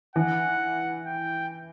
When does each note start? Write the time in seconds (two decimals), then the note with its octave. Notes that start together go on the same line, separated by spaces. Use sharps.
0.16 E3 F#5
1.06 G5